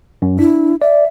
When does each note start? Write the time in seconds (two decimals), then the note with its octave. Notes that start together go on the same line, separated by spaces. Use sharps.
0.22 F#2
0.39 D4 E4
0.82 D5 E5